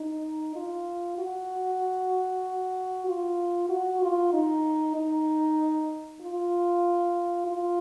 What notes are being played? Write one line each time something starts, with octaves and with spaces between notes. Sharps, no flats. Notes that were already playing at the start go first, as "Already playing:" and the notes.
Already playing: D#4
F4
F#4
F4
F#4
F4
D#4
D#4
F4
F4